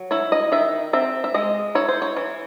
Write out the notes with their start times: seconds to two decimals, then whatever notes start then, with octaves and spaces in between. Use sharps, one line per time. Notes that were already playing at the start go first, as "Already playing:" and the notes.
Already playing: F#3
0.11 E4 C#5
0.32 D#5
0.52 D#3 E5
0.93 C4 E5
1.24 E5
1.34 G#3 D#5
1.75 E4 C#5
1.89 C5
2.02 C#5
2.16 E3